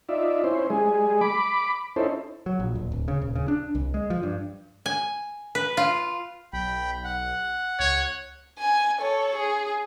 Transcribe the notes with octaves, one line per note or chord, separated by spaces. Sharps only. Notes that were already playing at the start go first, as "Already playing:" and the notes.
D#4 F4 D5 E5
C#4 E4 C5
G3 G#3 G#4
B5 D6
C#4 D#4 E4 A4 C5
F#3
A#1
D#1
D1
C#3
D#1
C#3
D4
C2
G#3
F3
G2
G#5
B4
F4
B1 G5 B5
F#5
C#2 C#5
G#5
A4 C#5
G#4